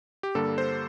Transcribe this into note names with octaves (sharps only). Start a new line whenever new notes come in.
G4
G2 D3 G3 A#3 A4
C5